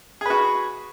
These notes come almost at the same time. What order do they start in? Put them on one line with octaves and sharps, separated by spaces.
G#4 B4 F#4